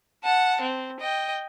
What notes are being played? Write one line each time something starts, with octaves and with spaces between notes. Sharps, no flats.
F#5 A5
C4
D#5 G5